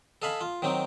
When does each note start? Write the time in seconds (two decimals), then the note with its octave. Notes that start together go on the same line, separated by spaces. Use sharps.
0.22 A4 D#5 F5 G#5 B5
0.41 F4
0.62 D#3 F#3 C4 D#4